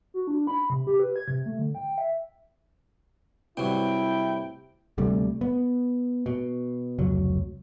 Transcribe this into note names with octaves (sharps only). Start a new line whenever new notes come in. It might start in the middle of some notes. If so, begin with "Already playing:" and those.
F#4
D4
B5
C3
G4
B4
G#6
C3
A3
D3
G5
E5
G2 C3 F#3 E4 G5
D2 C3 G3 A3
B3
B2
F1 C#2 F#3